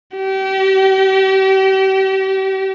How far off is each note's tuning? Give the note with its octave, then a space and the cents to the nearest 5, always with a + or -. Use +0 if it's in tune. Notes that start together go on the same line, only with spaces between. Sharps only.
G4 -35